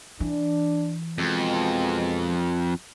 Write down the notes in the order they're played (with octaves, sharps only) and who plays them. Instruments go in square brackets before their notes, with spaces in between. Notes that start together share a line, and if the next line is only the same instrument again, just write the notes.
[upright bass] E3 [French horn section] D4
[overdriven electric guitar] F2 [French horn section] B2 G#3